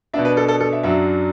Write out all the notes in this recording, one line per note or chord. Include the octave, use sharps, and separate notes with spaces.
B2 B3 D4 E5
B4
A4
A4
A4
E5
F#2 F#3 D4 E5